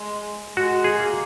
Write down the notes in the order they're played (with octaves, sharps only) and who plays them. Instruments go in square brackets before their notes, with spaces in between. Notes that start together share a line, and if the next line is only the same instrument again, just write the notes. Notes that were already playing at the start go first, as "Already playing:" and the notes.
Already playing: [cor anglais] G#3
[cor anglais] G#3 [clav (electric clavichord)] F#4
[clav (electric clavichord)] G#4
[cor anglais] A#3